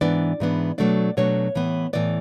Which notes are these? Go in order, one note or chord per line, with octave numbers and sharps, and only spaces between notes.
G#2 E3 B3 D4 D5
G#2 E3 B3 D4
B2 F#3 A3 D4 D5
B2 F#3 A3 D4 C#5
A2 E3 B3
A2 E3 B3 D5